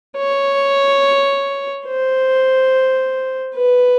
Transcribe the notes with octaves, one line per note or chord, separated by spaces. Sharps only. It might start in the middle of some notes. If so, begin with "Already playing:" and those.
C#5
C5
B4